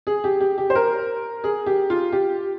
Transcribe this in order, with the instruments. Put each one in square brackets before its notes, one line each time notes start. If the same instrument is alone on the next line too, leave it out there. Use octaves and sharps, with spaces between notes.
[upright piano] G#4
G4
G4
G4
C5
A#4
G#4
G4
F4
G4